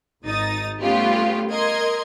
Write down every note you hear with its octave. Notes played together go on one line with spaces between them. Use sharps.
G#1 D#4 D#6 A6
G3 A3 B3 C#4 F4 G4
A#4 D#5 C6 G#6